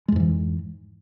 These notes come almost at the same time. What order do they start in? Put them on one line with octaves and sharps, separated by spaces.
G#3 F2 G#2 E3